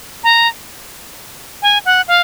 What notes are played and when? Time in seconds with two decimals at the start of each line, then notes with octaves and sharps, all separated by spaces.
0.24 A#5
1.62 G#5
1.85 F#5
2.08 F5